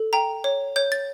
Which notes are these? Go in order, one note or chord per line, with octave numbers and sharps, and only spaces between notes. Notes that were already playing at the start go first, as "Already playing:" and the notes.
Already playing: A4
G5 A#5
C#5
C#5 G6
A6